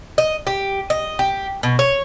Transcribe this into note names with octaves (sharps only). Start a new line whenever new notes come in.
D#5
G4
D#5
G4
B2
C#5